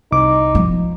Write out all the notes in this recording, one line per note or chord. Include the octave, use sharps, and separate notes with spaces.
C2 D#4 D6
F3